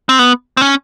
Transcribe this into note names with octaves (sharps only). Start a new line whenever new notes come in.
C4
B3
C4
C#4